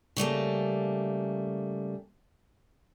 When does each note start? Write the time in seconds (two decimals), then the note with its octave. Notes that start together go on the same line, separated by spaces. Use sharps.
0.16 C#3 G3 A3 A#3